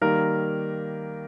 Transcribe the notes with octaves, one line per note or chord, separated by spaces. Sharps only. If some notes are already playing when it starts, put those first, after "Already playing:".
D#3 G3 A#3 A#4